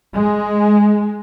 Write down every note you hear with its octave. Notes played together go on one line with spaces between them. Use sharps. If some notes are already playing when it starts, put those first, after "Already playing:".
G#3